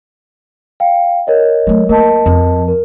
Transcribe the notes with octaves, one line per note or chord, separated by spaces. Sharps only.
F5 G5
A#4 C#5 D#5
F#3 A3
A#3 A#4 D#5 A5
F2 F3
A#4